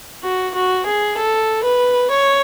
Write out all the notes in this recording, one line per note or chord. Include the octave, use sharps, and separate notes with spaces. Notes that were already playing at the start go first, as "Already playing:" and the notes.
F#4
F#4
G#4
A4
B4
C#5